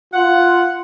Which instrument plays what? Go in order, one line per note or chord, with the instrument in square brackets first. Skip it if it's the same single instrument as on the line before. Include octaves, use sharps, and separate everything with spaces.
[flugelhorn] F4 [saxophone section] F#5